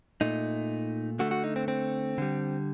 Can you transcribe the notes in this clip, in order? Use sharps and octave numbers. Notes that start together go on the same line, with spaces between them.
A#2 A3 D#4
D3 A3 F#4
F#4
D#4
C4
C4
D3 G3